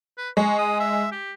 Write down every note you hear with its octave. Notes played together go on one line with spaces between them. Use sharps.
B4
G#3 C#6
D#6
E5
G4